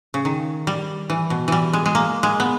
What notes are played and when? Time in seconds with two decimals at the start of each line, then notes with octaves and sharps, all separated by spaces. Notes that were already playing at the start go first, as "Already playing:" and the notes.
0.14 C#3
0.25 D#3
0.67 G3
1.10 E3
1.30 B2
1.48 E3 G3
1.73 G#3
1.86 G#3
1.95 A#3
2.23 G#3
2.40 B3